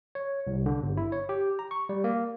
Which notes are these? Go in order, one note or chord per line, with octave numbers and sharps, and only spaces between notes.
C#5
C2
D3
G1
E4
C#5
G4
A#5
C#6
G3
A#3